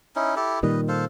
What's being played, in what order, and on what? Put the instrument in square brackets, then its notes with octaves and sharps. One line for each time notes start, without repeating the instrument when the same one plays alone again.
[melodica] C#4 D#4 E4
E4 G4 A4
[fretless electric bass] A#2 D#3 G3 [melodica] B4 D#5
[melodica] A4 C5 F5